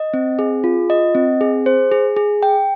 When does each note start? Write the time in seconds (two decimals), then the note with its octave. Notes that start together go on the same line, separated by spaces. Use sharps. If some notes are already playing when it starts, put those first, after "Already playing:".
Already playing: D#5
0.14 C4
0.39 G#4
0.64 F4
0.90 D#5
1.15 C4
1.41 G#4
1.66 C5
1.92 G#4
2.17 G#4
2.43 G5